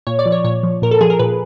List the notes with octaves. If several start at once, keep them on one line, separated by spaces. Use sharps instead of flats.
A#2 C#5
D5
F3
C#5
A#2 C#5
F3
A#2 A#4
A4
F3 G#4
A#4
A#2 B4